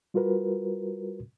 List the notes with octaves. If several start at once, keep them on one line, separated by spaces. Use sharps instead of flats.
G3 F4 F#4 A#4 B4